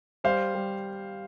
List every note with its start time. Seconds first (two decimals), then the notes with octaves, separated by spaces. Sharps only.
0.24 G3 C5 F5
0.55 G3